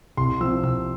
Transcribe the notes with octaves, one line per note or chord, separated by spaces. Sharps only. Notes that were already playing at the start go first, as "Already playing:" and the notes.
C2 C6
C3 F3 E6
C2 E6